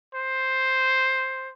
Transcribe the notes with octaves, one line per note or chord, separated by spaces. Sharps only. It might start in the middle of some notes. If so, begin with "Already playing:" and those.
C5